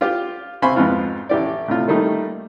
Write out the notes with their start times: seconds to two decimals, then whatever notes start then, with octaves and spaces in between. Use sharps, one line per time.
0.01 F4 G4
0.62 C3 C5 F5 G#5 B5 C#6
0.76 F2 G#2 F3 B3 F4
1.29 A1 G4 D5
1.68 A2 C3 F4
1.88 D#3 G3 A3 A#3 D#4